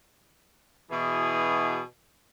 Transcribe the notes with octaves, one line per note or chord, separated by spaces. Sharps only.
B2 E3 G#4